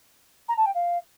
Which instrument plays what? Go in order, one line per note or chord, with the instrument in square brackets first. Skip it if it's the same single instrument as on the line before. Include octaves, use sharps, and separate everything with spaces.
[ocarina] A#5
A5
G5
F5